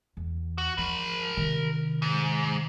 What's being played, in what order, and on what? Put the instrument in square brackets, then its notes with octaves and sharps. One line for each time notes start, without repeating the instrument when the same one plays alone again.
[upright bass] E2
[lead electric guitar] F#4
[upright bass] F3 [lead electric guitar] A#4 B5
[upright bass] C3 D#3
[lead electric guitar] G#2